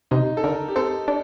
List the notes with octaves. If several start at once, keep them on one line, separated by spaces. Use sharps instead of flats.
C3 D#4
A4
D3 A#4
G4
C4 A4
D4